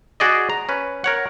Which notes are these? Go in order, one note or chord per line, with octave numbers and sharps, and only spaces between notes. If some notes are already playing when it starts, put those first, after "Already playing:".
F#4 G#4 D5 D#5
A#5
C#4 B4
A#4 C#5 F#5